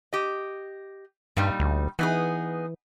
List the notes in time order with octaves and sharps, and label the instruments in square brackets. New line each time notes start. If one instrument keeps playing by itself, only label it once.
[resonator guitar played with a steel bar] G4 D#5
[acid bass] G2 [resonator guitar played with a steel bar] A#2 G3 D#4
[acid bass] D2
[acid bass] E3 [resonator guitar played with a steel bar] B3 D#4 G#4